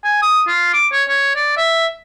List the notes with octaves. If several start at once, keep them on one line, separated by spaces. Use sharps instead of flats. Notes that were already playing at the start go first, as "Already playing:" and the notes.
G#5
D#6
F4
D6
C#5
C#5
D5
E5